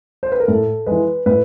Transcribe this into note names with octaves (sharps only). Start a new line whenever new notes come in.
C5
B4
A#4
A2 A4
E3 G#3 B4
A2 B4